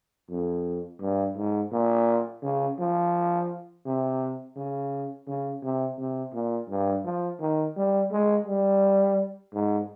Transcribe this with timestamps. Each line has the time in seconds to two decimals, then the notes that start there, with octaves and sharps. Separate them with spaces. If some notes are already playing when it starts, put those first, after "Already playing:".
0.30 F2
1.01 G2
1.36 G#2
1.72 A#2
2.43 C#3
2.79 F3
3.85 C3
4.56 C#3
5.27 C#3
5.63 C3
5.98 C3
6.34 A#2
6.70 G2
7.04 F3
7.40 D#3
7.77 G3
8.12 G#3
8.47 G3
9.53 G#2